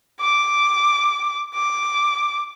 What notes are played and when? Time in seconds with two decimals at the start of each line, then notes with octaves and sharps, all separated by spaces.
0.20 D6
1.54 D6